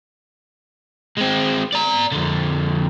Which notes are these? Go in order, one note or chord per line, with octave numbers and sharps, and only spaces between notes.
G#3 C4
D5 A#5
F2 D3